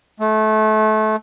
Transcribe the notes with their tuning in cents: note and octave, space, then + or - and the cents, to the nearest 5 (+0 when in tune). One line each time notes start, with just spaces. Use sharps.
A3 -25